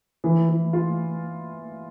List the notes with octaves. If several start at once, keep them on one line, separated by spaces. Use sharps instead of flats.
E3
E3
F4